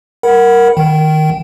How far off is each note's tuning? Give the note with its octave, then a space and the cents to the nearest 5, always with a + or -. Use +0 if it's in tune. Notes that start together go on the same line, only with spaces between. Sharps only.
A#4 +0 F#5 +0 B5 -15
D#3 +0 G5 -25